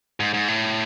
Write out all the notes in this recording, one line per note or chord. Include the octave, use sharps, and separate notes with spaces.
G#2
G#2
A2